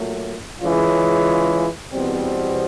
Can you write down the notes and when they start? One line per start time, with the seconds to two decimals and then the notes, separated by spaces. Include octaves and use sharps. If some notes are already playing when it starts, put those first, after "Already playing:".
Already playing: A#2 F#3 A3
0.61 C#3 E3 G#3 C#4 F4
1.92 E2 B2 G3 C4